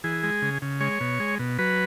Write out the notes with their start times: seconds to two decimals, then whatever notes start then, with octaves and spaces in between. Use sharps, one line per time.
0.04 E3 G#4
0.23 G#3
0.42 C#3
0.62 C#3
0.80 G#3 C#5
1.01 B2
1.20 G#3
1.39 B2
1.59 F#3 B4